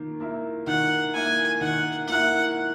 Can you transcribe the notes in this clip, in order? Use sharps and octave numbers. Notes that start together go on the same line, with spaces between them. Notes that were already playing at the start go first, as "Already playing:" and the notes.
Already playing: D#3 A#3
A#3 E4
D#3 F#5
A#3 E4 G#5
D#3 F#5
A#3 E4 F#5